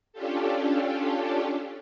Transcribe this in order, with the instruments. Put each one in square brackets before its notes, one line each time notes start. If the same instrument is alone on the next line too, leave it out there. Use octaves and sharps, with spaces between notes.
[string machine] C#4 D4 F4 G4 A4